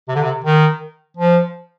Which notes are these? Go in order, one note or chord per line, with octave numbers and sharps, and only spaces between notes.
C3
D3
C3
D#3
F3